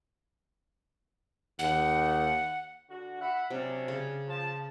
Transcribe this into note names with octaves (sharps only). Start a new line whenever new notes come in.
D#2 F#5
D3 F#4
E5 F#5 B5
C3 F#3 C#4 D4
C#3
F3 A5